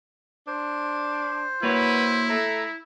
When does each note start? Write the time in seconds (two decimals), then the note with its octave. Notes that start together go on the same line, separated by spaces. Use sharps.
0.47 D4 C5
1.63 A#3 E4 F#4 B4 C#5
2.29 A3 A#5